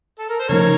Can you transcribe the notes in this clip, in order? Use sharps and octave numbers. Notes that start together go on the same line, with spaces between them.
A4
A#4
C5
C#3 F3 A3 D#4 A#4 C#5